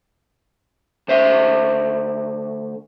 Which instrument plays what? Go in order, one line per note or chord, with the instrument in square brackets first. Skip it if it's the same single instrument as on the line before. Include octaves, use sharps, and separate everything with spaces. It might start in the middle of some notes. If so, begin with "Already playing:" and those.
[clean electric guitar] D2 C5 E5